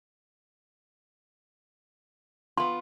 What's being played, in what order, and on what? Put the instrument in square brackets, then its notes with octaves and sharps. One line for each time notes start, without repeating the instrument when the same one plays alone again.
[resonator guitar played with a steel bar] B3 F4 [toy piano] C6